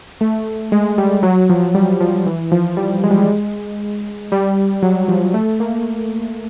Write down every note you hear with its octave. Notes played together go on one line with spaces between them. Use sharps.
A3
G#3
G3
F#3
F3
G3
F3
E3
F3
G3
G#3
G3
G#3
G3
F#3
F3
A3
A#3